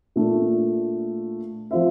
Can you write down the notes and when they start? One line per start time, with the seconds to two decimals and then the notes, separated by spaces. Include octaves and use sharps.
0.16 A#2 A3 D4
1.71 F3 C4 F4 C5 E5